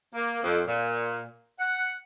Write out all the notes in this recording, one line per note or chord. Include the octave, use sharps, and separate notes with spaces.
A#3
F2
A#2
F#5